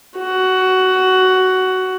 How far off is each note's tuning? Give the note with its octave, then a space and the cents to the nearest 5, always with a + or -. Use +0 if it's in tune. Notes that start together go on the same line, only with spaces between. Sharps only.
F#4 +15